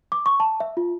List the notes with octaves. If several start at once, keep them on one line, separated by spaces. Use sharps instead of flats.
D6
C#6
A5
E5
F4